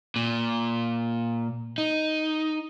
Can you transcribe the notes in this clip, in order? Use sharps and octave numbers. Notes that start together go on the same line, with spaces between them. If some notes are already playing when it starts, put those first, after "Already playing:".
A#2
D#4